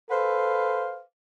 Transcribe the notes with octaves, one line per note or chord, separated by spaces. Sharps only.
A4 B4 C5 F5